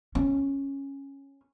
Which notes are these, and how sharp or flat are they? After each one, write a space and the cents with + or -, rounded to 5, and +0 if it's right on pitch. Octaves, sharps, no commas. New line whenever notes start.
C#4 -10